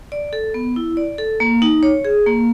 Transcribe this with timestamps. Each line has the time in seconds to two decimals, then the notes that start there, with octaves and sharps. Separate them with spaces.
0.12 D5
0.33 A4
0.54 B3
0.76 E4
0.97 D5
1.18 A4
1.40 A#3
1.62 D#4
1.83 C#5
2.05 G#4
2.27 A#3